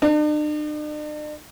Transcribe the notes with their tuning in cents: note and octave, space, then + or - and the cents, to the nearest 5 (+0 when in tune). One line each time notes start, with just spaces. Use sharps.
D4 +45